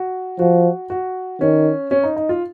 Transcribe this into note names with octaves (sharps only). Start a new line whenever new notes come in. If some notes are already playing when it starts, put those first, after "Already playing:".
Already playing: F#4
F3 F#4
F#4
D#3 C#4
C#4
D#4
D#4
F4